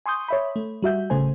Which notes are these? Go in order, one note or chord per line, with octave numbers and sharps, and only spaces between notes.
G#5 C6 C#6 D#6 G6
C#5 E5 B5
A3
G3 F#4 E5 G6
A1 C#3 A3 C5 G#5